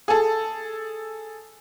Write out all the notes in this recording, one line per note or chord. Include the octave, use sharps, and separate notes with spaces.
G#4 A4